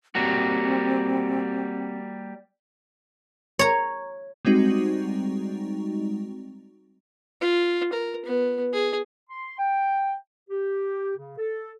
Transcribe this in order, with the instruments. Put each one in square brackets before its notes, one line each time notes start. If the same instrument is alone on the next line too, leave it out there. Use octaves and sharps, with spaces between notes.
[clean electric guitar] G3 A#3 F#4 [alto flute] C4
[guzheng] C#5 A#5
[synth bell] G3 G#3 C4 D#4 F#4
[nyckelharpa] F4
A#4
B3
G#4
[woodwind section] C6
G5
G4
C#3
A4